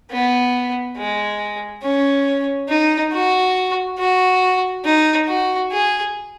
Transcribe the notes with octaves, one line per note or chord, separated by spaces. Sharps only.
B3
G#3
C#4
D#4
F#4
F#4
D#4
F#4
G#4